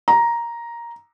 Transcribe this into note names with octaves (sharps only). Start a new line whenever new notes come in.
A#5